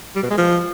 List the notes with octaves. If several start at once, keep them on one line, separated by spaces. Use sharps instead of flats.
G3
B2
G#3
F3